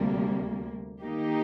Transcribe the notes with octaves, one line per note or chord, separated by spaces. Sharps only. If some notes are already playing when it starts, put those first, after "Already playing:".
Already playing: D2 C3 G3 A#3
D#3 A#3 D#4 G4